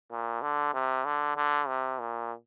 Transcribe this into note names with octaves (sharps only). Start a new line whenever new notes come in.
A#2
D3
C3
D3
D3
C3
A#2